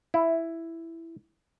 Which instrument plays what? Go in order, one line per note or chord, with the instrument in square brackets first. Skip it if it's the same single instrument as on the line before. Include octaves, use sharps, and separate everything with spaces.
[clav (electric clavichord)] E4